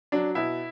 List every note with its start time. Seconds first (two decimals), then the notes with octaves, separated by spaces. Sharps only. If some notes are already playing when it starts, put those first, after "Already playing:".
0.12 F#3 D4
0.35 B2 E4